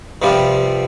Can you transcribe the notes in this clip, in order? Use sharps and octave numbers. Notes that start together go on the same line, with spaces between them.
G2 C3 F3 G3 F4